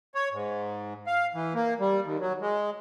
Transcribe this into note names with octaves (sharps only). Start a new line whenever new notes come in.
C#5
G#2
F5
E3
A#3
G3
D#2
F#3
G#3